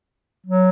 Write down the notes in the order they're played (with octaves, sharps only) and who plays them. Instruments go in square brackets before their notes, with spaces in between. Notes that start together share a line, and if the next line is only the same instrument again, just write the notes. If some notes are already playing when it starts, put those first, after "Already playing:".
[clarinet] F#3